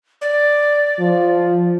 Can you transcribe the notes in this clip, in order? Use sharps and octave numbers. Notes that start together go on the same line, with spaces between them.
D5
F3